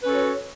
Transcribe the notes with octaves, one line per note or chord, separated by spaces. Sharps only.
C#4 F#4 A4 B4 C#5